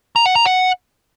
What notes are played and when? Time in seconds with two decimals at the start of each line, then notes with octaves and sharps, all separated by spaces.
0.16 A#5
0.26 F#5
0.36 A#5
0.45 F#5